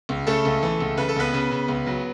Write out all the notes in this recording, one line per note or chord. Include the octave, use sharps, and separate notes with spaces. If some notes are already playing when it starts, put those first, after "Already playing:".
C#2
C#3 A3 A4
C#2
E3
C#2
C#3 B4
A4
C#2 B3 B4
C#3
C#3
C#2
F#3